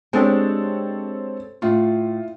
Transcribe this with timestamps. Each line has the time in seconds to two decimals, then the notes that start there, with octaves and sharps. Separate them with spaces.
0.13 G#3 C4 D4 G4 A4 C#5
1.62 A2 F4